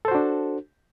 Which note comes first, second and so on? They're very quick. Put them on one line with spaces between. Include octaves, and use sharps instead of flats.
A4 C5 F#4 D4